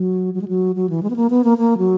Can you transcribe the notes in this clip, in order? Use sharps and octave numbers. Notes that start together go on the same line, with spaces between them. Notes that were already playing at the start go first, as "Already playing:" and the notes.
Already playing: F#3
F#3
G#3
F#3
F#3
E3
G#3
B3
A#3
B3
A#3
A#3
F#3